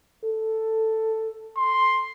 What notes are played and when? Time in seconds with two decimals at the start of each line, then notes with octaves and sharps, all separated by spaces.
0.24 A4
1.57 C6